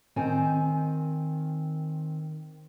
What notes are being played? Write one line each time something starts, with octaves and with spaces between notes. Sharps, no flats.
D#3 C4 G5 G#5